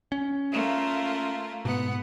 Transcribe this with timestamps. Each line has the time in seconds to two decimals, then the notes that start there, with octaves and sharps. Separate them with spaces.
0.12 C#4
0.52 A3 A#3 F4
1.65 G#2 B2 B3 F#5